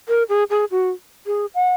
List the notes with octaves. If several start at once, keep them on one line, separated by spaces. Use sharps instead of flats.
A#4
G#4
G#4
F#4
G#4
F#5